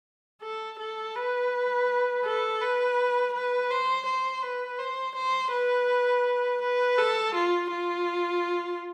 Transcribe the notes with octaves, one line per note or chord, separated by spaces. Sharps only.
A4
A4
B4
A4
B4
B4
C5
C5
B4
C5
C5
B4
B4
A4
F4
F4